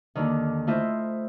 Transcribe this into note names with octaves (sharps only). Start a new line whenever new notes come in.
D#2 D3 D#3
A3 E4 F4 C5 D#5 E5